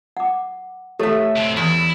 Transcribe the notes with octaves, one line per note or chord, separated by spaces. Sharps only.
F#5 D6
A3 G4 A4 C#5 E5
B2 C4
E2 E4